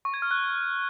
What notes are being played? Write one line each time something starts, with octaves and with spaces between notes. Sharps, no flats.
C#6
G#6
F6
F#6